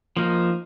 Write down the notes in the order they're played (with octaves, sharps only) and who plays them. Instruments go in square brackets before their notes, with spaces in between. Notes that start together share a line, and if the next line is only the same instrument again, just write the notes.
[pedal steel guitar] F3 A#3 D#4